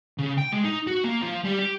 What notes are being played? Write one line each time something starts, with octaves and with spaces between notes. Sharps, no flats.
C#3
G5
G#3
D#4
F#4
A#3
F3
G3
G4